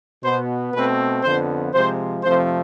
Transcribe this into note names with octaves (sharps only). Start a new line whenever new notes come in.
B2 B3 C5
B2 A3 C4 B4
F2 D3 F3 B3 C5
C3 F3 G#3 C5
F2 C3 F3 A3 C4 C5